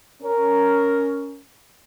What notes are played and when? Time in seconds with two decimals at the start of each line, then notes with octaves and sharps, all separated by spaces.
0.23 C#4 A#4